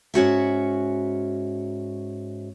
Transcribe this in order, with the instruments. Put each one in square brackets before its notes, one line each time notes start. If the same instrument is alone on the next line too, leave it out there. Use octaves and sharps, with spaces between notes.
[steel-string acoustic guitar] G#2 C#4 F#4 E5